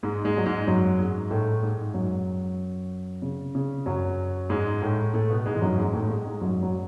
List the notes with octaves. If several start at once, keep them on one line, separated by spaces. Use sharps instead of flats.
G#2 G#3
G#2 G#3
F#3
G#2 G#3
F#2 F#3
G#2 G#3
A2 A3
G#2 G#3
F#2 F#3
C#3
C#3
F#2 F#3
G#2 G#3
A2 A3
A2 A3
B2 B3
G#2 G#3
E3
F#2 F#3
G#2 G#3
A2 A3
G#2 G#3
G#2 G#3
F#2 F#3
F#3